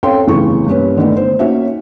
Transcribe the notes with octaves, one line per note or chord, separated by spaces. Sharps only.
C4 C#4 A4 F5 G5 C6
F1 B1 C#3 E3 E4 C#6
G2 A#3 C#4 B4
D3 D#3 A3 B3
C5
A#3 C#4 D#4 F#4 C#5 E5